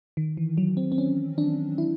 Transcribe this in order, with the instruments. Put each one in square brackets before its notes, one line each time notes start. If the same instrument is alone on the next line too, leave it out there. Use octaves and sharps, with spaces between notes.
[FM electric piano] D#3
E3
F#3
C4
C4
C#4
D4
E4